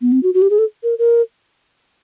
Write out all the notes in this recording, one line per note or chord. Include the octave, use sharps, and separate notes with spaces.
B3
C4
F#4
F#4
G4
G#4
A4
A#4
A#4